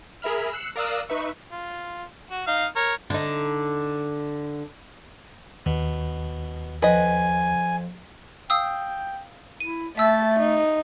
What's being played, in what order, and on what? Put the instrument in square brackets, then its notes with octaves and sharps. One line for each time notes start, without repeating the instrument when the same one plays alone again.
[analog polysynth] G#4 A#4 E5 B5 F6
E6 F#6 C7 C#7
A#4 D5 F5 D#6 E6 F#6
D#4 B4 E5 C#6
[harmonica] F4
F#4
D#4 F5
A#4 C#5
[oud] D3 D#4
[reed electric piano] D#2 [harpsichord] B2
[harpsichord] F2 [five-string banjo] B4 D#5 [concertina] G#5
[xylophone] F5 D#6 E6 [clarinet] G5
[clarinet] E4 [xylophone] D#7
[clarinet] A3 [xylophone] E5 E6 [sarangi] A5
[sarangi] D#4